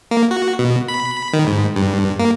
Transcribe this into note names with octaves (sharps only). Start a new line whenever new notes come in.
A#3
F#4
B2
B5
D#3
G#2
G2
A#3